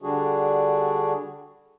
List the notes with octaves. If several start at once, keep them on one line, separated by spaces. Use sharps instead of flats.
D3 G3 D4 F#4 G#4